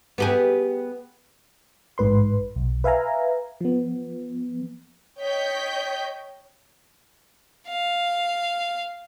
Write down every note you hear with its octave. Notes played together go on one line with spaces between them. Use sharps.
B3 G4 G#4
A1 G#2 B4 C6
B1
B4 E5 F5 G#5 A#5
F3 B3
C#5 D#5 G5 G6 B6
F5